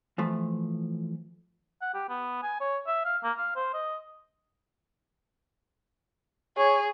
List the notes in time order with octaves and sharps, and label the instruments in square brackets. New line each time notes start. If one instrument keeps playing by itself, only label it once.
[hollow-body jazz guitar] E3 F3 A3
[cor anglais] F#5
G4
B3
G#5
C#5
E5
F5
A#3
F5
C5
D#5
[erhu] G#4 [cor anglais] C#5